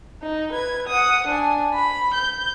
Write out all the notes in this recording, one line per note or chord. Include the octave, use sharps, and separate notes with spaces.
D#4
B4 G#6
F#5 D#6
D4 G#5
B5
G6